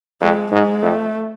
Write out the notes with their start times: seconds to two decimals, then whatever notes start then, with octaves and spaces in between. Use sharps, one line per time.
0.21 F2 G#3
0.52 G#2 G#3
0.83 F2 A3